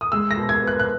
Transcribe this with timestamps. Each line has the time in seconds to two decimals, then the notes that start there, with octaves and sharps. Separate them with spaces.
0.01 D#6
0.12 G#3 E6
0.31 A#6
0.37 B2
0.49 G#6
0.60 B3
0.67 F#6
0.80 F#6